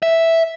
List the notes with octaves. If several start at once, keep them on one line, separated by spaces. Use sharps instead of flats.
E5